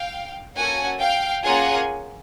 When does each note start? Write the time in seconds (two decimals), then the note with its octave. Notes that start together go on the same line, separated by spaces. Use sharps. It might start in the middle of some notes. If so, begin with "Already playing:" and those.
Already playing: F5 G5
0.56 A#3 C#4 F#4 A4 F#5 G#5
0.99 F5 G5
1.43 A#3 C#4 F4 G#4 F#5 G#5